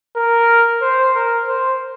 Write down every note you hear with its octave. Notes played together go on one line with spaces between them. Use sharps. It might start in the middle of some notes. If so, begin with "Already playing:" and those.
A#4
C5
A#4
C5